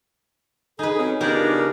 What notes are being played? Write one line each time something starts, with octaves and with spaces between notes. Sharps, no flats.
D#4 G#4 A4 B4
F#3 C4 C#4
C#3 F3 B3 D4 D#4 G4 A#4